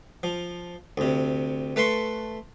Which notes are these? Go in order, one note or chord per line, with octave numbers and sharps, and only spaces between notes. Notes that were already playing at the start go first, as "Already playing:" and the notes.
F3
D2 C3
A3 B4 A5 C6 C#6